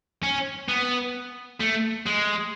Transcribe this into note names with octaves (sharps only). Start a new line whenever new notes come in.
C#4
B3
A3
G#3